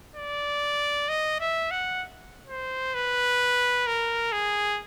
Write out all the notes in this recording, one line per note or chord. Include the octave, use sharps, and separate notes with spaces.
D5
D#5
E5
F#5
C5
B4
A#4
G#4